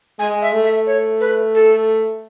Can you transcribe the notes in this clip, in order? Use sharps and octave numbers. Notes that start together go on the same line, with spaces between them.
G#3 G#5
E5
A3
E5
C#5
B4
A4